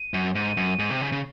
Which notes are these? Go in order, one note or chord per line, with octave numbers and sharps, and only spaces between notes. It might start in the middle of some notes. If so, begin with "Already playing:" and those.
Already playing: D#7
F#2
G#2 D#7
F#2
G#2
C3
C#3
C#3